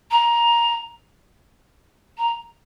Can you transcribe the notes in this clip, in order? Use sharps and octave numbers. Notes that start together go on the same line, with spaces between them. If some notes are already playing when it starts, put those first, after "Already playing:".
A#5
A#5